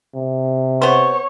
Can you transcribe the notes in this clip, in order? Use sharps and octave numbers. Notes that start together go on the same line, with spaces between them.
C3
B3 C5 C#5